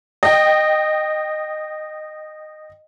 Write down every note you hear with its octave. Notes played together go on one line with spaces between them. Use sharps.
D#5 G5